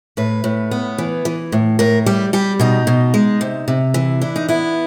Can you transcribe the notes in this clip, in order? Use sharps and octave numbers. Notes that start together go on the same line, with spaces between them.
A2 B4
A2
B3
E3
E3
A2
A2 A#4
G3 G4
G3 G4
B2 D#4
B2
G#3
C3
C3
E3
D4 E4
D#4
B3 E4